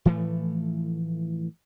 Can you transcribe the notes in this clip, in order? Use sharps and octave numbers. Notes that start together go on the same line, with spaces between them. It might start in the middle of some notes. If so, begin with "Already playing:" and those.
A2 E3 F3 A3